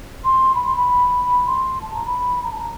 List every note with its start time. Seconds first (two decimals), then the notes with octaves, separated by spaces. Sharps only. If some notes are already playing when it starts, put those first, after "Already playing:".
0.24 C6
0.55 B5
0.67 C6
0.77 B5
1.47 C6
1.81 A5
1.94 A#5
2.06 B5
2.37 B5
2.44 A#5
2.52 A5
2.58 A#5